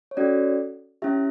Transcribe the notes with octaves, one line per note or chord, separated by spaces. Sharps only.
C#5
C#4 F#4 A4 D5
C#4 E4 G4 E5